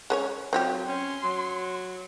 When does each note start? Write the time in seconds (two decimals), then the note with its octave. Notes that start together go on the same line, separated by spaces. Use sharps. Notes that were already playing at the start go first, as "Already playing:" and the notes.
0.10 G#3 C#4 C#5
0.53 F#3 C4 F4 G4
0.88 C#4 C6
1.24 F#3